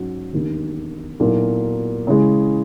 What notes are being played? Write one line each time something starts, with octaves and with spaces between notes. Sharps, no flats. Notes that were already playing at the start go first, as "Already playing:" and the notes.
Already playing: G#2 F#3 C#4 F#4
E1 D#2 D#3
B1 A#2 F#3 A#3 E4
C#3 E3 G#3